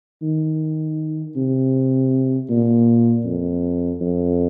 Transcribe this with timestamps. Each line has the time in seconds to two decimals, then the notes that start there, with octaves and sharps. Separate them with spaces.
0.22 D#3
1.36 C3
2.49 A#2
3.25 F2
4.01 F2